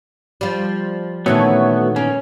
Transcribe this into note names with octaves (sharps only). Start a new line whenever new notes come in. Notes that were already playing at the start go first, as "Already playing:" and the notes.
F3 G3
A#2 D#3 E3 A3 B3 C#4 F#4 C#5
A#3 C#4